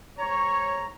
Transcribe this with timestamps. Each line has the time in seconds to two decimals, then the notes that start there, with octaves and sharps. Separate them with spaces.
0.18 G#2 C#5 A#5